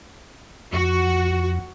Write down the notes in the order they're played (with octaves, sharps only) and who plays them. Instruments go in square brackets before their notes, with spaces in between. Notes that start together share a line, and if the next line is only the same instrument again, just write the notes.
[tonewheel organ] F2 [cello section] F#4